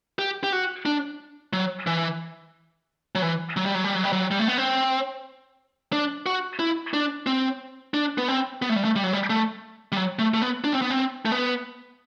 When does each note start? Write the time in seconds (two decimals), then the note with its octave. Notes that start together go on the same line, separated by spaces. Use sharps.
0.19 G4
0.44 G4
0.53 F#4
0.86 D4
1.53 F#3
1.87 E3
3.15 F#3
3.22 E3
3.57 F#3
3.66 G3
3.74 F#3
3.84 G3
3.95 F#3
4.04 G3
4.13 F#3
4.31 G3
4.39 A3
4.48 B3
4.58 C4
5.92 D4
6.26 F#4
6.59 E4
6.94 D4
7.27 C4
7.94 D4
8.18 B3
8.28 C4
8.62 B3
8.69 A3
8.76 G3
8.85 A3
8.96 G3
9.04 F#3
9.13 G3
9.30 A3
9.92 G3
9.97 F#3
10.19 A3
10.34 A3
10.42 B3
10.64 D4
10.73 C4
10.82 B3
10.90 C4
11.25 A3
11.32 B3